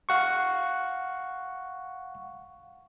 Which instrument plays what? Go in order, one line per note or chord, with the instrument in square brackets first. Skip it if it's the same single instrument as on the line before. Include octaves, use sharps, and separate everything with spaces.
[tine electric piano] F5 F#5 C#6